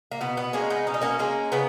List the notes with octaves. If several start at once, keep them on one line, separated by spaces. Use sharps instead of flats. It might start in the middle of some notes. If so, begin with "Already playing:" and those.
A#3
B2 B3
B3
G#3 A#3 C#4
B3 D#4
B2 C#4
D#4
A#3 C#4
G#3 A#3 C#4
C#3 B3 D#4